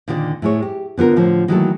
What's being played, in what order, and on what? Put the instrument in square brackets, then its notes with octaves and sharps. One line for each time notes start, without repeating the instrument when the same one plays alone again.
[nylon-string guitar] A#2 D3 D#3 F4 D5
A2 G#3 C#5
G4
D3 B3 F4 A#4
A2 D3 F3
D#3 E3 F#3 A3 A#3 A4